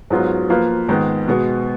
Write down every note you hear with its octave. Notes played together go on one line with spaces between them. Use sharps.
G#2 F#3 B3 F4
F3 A#3 F4 B4
G#2 D#3 G#3 B3
B2 G#3 B3